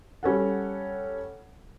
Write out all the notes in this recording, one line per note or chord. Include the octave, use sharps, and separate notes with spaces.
G3 C#4 A4 F#5